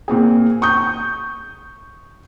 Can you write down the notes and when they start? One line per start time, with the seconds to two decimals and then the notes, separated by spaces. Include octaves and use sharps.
0.08 A#2 C4 G#4
0.62 C#6 D#6 G6